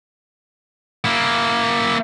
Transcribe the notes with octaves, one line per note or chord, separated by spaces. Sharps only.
A#3 E4